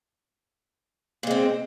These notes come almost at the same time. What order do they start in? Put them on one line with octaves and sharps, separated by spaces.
A#2 G#3 C4